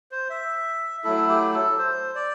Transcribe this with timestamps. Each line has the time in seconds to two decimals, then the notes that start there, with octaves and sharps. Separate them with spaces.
0.11 C5
0.30 E5
1.04 F#3 A3 E4 A4
1.29 G4
1.53 A4
1.78 C5
2.15 D5